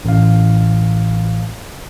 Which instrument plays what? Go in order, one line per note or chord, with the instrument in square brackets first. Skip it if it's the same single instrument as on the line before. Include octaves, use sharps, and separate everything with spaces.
[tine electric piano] A1 F5